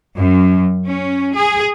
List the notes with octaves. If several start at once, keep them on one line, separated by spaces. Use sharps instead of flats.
F#2
C#4
G#4